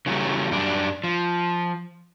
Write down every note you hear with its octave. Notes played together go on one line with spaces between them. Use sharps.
C#3 E3 F#3 G3 A3
F#2 G3 D4
F3